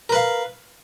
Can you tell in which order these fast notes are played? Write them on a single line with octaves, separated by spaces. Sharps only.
A#4 B4 F5